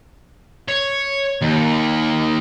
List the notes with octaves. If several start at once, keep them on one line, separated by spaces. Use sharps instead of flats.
C#5
D#2